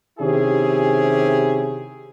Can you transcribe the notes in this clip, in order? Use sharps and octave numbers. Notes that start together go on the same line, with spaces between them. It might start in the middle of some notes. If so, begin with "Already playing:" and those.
C3 D#3 C#4 E4 G4 G#4